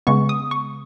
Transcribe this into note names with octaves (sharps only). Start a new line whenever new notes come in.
C#3 G#3 B3 C#6
D#6
C#6